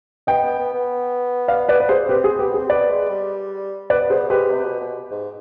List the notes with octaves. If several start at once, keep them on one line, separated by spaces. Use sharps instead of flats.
B3 D#5 G5
B3
B3
B3
D5 F5
B4 D5
B4
G#4 C5
C4 G4 B4
G#4
B3 G4
G#4
C4
B3 B4 D5
G#3
G3
B3 B4 D5
B3 G#4 C5
G#3 G4 B4
C3
B2
B2
G#2